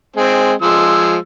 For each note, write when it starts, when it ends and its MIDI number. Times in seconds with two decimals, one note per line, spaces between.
0.16 0.52 56
0.16 0.52 60
0.62 1.16 53
0.62 1.16 56
0.62 1.16 88